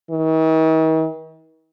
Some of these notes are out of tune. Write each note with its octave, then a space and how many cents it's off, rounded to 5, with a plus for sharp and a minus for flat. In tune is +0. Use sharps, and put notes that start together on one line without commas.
D#3 +45